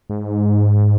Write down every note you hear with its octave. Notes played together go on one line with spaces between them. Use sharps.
G#2